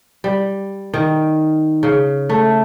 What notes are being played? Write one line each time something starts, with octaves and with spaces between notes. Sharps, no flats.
G3
D#3
C#3
A3